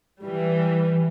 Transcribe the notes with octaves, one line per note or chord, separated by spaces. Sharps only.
E3 G3